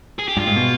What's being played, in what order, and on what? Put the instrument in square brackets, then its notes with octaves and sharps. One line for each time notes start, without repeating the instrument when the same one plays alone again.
[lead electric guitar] G#4
G4
[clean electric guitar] G2 [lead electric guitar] F4
[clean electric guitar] G#2
B2